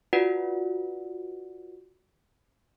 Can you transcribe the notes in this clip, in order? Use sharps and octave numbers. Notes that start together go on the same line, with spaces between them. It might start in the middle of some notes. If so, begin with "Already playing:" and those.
F4 F#4 B4 D5 F#5